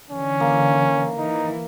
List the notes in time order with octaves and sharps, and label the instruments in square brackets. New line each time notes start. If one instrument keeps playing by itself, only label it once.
[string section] D3 E3 [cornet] C#4
[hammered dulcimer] A#3
[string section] E3 [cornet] D#4